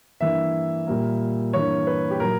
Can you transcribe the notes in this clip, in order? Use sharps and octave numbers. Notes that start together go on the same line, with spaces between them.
G2 E3 A#3 E5
A#2 G3 A#3
G2 E3 A#3 C#5
B4
G4
A#2 F#3 A#4